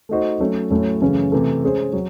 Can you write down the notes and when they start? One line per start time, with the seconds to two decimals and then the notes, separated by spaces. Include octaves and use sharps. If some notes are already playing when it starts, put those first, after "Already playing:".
0.09 A3 D#4 F#4 C5 D#5
0.40 F#3 A3 C#4
0.70 A2 F#3 A3 C#4
1.01 F#2 C#3 E3 A3 C#4
1.32 C3 E3 A3
1.64 G#3 C#4 G#4 C5
1.93 F#3